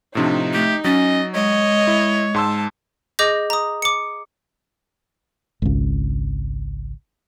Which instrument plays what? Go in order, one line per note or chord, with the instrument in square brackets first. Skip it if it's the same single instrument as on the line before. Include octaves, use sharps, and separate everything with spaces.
[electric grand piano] A2 C3 F3 [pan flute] D4 [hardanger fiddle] D#4
[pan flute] A3 [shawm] G4
[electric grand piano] F#3 A6 [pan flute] C#4 [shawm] D#5
[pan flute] G#3 [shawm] C#5 [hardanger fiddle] D#5
[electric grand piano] E4
[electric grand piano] G#2 C6 E6 [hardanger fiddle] A5
[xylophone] G#4 D#5 D6 G6 A#6
A#5 D#6
D6 C#7
[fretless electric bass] G#1 C#2